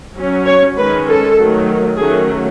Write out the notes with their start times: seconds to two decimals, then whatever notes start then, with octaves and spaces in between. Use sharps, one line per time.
0.15 F#3 C#4
0.46 C#5
0.76 D#3 G#3 C#4 B4
1.07 A4
1.37 D#3 F#3 A3
1.98 D#3 F#3 A3 C#4 G#4